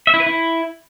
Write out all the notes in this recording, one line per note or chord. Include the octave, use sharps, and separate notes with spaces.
E5
E4
B4
E4